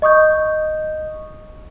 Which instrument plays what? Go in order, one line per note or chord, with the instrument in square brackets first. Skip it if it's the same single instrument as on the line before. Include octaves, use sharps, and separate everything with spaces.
[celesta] D#5 C#6 D#6 G6